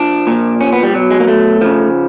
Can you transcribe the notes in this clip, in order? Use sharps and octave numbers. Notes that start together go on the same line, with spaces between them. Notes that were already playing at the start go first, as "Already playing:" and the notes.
Already playing: F3 D4
A#2 F3
C#4
B3
G3
B2 F#3
G#3
A#3
A3
C#3 F3